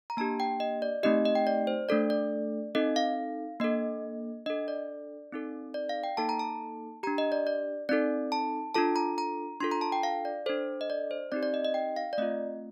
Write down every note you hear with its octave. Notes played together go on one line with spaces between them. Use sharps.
A#5
A#3 D4 G4 A5
G5
D#5
D5
A3 C4 D#4 G4 D#5
D#5
G5
D5
C5
A3 D4 A4 D5
D5
C4 D#4 A4 D#5
F5
A#3 D4 A4 D#5
D4 A4 D#5
D5
C4 D#4 A4
D5
F5
G5
A#3 D#4 A4 A5
A#5
A5
D4 G4 A#5
D#5
D5
D5
C4 D#4 A4 D5
A5
D4 F4 A4 A5
A#5
A#5
D4 F4 A4 C6
A#5
A5
G5
F5
D5
D4 A4 C5
D#5
D5
C5
C4 D#4 G4 D5
D5
D#5
D#5
G5
F5
D5
A3 C4 F4 D#5